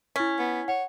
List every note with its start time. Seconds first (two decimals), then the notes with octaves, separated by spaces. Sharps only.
0.16 C#4 E4 B6
0.39 B3
0.68 C#5 F#5